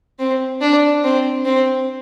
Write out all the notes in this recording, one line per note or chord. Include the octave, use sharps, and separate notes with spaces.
C4
D4
C4
C4